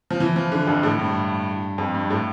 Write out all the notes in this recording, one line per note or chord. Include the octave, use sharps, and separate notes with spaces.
F3
E3
F3
D3
F2
A2
G2
F2
G2
A2